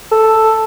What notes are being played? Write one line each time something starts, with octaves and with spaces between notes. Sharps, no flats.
A4